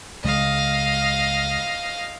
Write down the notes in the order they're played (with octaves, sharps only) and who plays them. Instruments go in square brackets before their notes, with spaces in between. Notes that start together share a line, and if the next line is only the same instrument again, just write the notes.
[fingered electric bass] C#2 C#3 G#3 [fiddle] D#5 F5